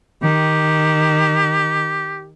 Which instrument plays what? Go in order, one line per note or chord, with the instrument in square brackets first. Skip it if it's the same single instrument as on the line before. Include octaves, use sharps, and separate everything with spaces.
[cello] D#3 [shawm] G4